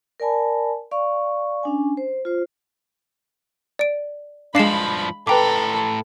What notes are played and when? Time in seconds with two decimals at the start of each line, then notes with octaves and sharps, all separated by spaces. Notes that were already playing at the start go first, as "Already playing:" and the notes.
0.20 A#4 D5 G#5 A5 B5
0.91 D5 F5 C#6
1.63 C#4 D4 G#5
1.97 C5
2.25 F4 C5
3.79 D5 D7
4.55 G2 F3 G#3 D4 F5 B5 C7 E7
5.27 A2 A4 B4 G5 A#5 B5 D6